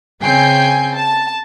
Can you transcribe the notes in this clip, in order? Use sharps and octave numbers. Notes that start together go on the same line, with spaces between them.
C#3 C4 G5 G#5 G6 C7
A5